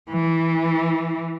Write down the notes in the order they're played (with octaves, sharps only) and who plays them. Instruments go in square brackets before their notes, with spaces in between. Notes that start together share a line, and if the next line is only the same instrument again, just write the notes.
[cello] E3